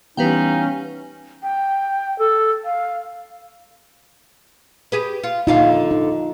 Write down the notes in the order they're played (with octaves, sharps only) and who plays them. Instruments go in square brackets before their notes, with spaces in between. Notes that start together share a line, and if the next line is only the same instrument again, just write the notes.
[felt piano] E3 G3 B3 [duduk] C#4 [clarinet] D#4 [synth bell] B4 F5 G5
[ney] G5
A4
F5
[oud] G4 G#4 B4
F4
[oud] A#2 D3 F5 [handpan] D#4 F4
[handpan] D#4